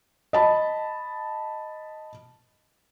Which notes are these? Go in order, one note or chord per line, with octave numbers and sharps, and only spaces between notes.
D#5 A5 B5